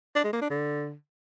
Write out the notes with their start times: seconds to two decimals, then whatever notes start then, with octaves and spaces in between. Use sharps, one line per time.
0.15 D4
0.24 G#3
0.33 A#3
0.41 D4
0.50 D3